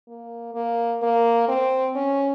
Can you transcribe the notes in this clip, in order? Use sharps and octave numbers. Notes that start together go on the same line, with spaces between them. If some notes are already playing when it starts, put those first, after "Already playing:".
A#3
A#3
A#3
C4
C#4